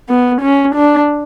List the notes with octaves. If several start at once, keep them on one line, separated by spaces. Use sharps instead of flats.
B3
C#4
D4